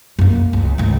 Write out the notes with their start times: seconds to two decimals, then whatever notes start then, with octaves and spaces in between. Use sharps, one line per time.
0.19 F#2 A#3
0.53 C#2
0.78 G#1 C#2